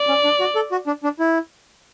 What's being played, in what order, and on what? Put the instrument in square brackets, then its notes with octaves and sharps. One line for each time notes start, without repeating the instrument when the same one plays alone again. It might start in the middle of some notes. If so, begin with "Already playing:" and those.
Already playing: [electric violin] D5
[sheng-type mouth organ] C#4
D4
F#4
A4
F#4
D4
D4
E4